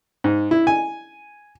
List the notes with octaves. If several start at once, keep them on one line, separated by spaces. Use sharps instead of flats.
G#2
E4
G#5